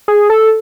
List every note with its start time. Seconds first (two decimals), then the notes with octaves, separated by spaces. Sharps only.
0.08 G#4
0.30 A4